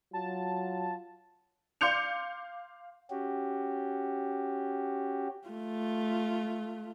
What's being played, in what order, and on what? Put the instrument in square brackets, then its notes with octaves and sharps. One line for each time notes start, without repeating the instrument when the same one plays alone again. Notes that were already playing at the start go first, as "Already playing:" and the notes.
[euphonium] F#3 [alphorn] F4 [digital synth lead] A5
[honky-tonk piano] F5 C6 D6 G6 C#7 F7
[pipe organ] C#4 F#4 G4
[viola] A3 F4